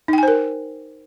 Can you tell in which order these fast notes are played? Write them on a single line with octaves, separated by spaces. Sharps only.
D#4 G5 G#5 C5 A#4